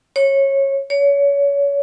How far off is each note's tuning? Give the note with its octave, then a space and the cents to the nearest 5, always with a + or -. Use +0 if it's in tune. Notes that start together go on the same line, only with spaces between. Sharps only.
C#5 -20
C#5 +30